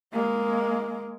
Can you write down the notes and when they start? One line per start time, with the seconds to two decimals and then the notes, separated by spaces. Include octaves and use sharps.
0.13 G#3 A#3